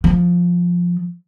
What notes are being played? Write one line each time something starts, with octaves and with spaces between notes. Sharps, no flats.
F3